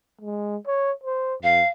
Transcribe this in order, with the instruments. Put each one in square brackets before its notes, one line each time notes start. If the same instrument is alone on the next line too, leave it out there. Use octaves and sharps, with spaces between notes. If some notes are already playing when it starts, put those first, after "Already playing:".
[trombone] G#3
C#5
C5
[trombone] F2 [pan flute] F5